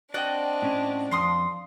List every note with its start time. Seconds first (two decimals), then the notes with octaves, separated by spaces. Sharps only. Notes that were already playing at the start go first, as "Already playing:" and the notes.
0.14 C4 D4 F#4 D5 D#5 G5
0.62 A2 C#4
1.11 F2 F5 C6 D#6